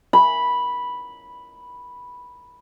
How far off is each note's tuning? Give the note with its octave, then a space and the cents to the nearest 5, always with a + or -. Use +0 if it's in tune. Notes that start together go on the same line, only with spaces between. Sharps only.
B5 -5